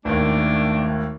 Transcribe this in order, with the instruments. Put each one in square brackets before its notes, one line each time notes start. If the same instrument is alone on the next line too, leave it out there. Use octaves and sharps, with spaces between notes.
[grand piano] G#1 D#2 [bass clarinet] A3 [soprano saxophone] D4